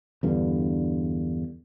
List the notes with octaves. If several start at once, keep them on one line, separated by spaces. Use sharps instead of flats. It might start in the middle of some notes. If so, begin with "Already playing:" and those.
E2 G2 D3